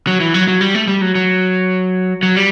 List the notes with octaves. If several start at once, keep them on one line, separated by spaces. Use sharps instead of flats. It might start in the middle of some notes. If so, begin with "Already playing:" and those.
F#3
E3
F#3
F#3
G3
A3
G3
F#3
F#3
F#3
G3